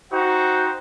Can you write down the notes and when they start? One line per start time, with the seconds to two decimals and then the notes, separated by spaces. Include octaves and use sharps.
0.12 D#4 F#4 C5 F#5 G5